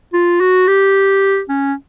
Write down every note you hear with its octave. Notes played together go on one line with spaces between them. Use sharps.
F4
F#4
G4
C#4